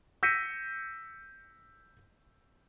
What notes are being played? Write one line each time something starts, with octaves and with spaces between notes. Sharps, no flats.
E6 G6 A#6 B6 C#7 D#7